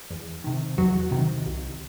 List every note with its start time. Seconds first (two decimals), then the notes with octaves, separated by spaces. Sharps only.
0.11 E2
0.44 C3 D#3
0.78 E2 F#3 F#4
1.11 C3 D#3
1.46 C2